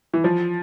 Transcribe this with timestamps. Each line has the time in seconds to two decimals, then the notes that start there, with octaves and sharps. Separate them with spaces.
0.14 E3
0.24 F3